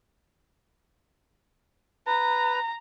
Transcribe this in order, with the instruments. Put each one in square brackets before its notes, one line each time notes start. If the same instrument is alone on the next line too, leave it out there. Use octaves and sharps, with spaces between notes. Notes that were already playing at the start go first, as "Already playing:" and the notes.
[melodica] B4 [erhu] A#5